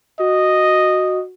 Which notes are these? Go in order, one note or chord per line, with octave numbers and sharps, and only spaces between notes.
F#4 D#5